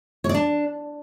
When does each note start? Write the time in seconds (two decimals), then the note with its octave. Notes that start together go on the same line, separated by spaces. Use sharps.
0.24 C#5
0.29 D5
0.34 D4